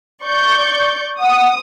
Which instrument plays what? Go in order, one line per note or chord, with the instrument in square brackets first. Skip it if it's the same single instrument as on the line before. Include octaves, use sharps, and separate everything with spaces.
[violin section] D5 C#6 G6
[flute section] F#5 [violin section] D#6